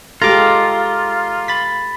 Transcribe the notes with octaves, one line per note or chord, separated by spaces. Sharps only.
G#3 F4 G4 A4 A#5 D6
B5 A6 B6